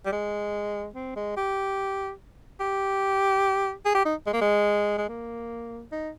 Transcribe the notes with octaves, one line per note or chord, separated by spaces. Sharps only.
G3
G#3
C4
G#3
G4
G4
G#4
G4
D#4
G#3
A#3
G#3
G#3
A#3
D#4